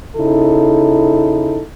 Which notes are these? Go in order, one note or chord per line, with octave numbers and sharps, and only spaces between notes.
C#3 D#4 E4 A4